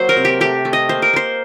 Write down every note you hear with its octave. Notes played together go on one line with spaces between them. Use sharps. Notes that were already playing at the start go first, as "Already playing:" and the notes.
Already playing: F#3 A#3 C5
A#4
C3
G4
A3 G4
A3
D#5
A#3 C5
A#4
A#3 C5